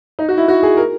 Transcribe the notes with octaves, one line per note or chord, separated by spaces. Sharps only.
D#4
F#4
E4
F#4
G#4
A#4